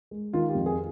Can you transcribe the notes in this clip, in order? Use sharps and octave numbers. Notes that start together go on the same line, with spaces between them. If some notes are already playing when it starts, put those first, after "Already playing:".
G#3
D#3 F4
G4
F2
G#4